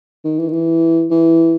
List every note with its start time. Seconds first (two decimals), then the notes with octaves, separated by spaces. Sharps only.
0.25 D#3
0.39 E3
0.48 D#3
0.53 E3
1.11 E3